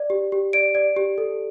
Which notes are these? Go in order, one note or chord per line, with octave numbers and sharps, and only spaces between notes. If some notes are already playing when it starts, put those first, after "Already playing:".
Already playing: D5
G4
G4
D5 D7
D5
G4
A4